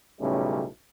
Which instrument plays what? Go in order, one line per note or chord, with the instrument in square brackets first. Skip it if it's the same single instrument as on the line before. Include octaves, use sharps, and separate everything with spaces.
[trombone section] B1 A2 C#3 G3 A3 C#4